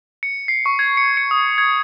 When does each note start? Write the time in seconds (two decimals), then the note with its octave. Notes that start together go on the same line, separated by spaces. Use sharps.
0.23 C#7
0.48 C7
0.66 C#6
0.79 G#6
0.97 C#7
1.17 C#7
1.31 D#6
1.58 G#6